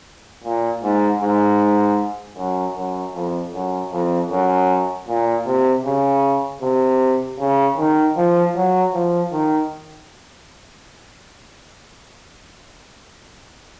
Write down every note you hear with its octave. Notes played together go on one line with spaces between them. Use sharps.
A#2
G#2
G#2
F#2
F#2
F2
F#2
F2
F#2
A#2
C3
C#3
C3
C#3
D#3
F3
F#3
F3
D#3